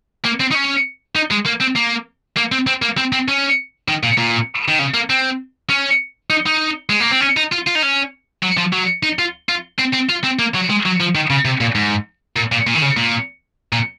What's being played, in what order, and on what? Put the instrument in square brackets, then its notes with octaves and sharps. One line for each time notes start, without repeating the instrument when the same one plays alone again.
[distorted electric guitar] A#3
C4
D#4
C#4
D#4
G#3
A#3
C4
A#3
A#3
C4
C4
A#3
C4
C4
C#4
D#3
A#2
A#2
D#3
C#3
A#3
C4
C#4
D#4
D#4
G#3
A#3
C4
C#4
D#4
F4
F4
D#4
C#4
F#3
F3
F#3
D#4
F4
F4
C4
C4
F4
C4
A#3
F#3
G#3
F#3
F3
D#3
C#3
C3
A#2
G#2
A#2
A#2
A#2
D#3
C#3
A#2
A#2